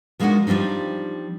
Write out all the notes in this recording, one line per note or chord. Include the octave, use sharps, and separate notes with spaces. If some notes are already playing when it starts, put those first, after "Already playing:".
F3 G#3 A#3 D4 D#4 F#4
F3 G3 C4 D4 D#4